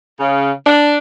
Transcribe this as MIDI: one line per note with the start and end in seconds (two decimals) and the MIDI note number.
0.20 0.52 49
0.65 0.98 62